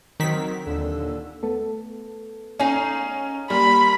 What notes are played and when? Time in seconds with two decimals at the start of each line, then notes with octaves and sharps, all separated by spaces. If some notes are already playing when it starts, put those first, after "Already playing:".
0.20 D#3 F#3 C4 A#4 B6
0.66 D#2 A#2 D3 E6
1.43 A3 B3 A4
2.60 C#4 D#4 G#4 F5
3.50 G3 A#3 A#4 B5 C6